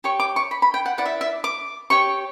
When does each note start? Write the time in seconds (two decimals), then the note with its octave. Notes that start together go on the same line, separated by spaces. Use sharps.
0.04 G4 C#5 C#6
0.20 D6
0.36 C#6
0.51 B5
0.62 B5
0.74 G5
0.86 F#5
0.98 E4 B4 D5 F#5
1.06 E5
1.21 E5
1.44 D6
1.90 G4 C#5 C#6